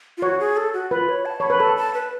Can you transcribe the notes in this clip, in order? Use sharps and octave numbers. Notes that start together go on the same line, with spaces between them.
F4
F#4 C#5
G#4
A4
F#4
F4 B4
C#5
A5
C#5 B5
B4
A4 A5
A5
B4